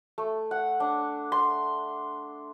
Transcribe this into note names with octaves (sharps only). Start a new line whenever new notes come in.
A3
F#5
D4
C6